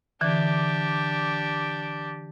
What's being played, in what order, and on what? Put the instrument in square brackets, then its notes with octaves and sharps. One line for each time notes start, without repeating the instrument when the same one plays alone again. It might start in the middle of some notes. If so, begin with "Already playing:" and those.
[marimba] D3 E3 [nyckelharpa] D4 G4